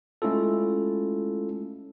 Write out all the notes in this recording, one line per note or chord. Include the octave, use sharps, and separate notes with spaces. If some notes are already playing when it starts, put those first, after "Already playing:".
G#3 A3 C#4 E4 F4 A4